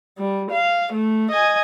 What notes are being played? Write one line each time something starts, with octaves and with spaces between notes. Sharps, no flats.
G3
F5
A3
D#5 G#5